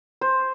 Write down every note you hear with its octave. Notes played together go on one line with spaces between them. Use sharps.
C5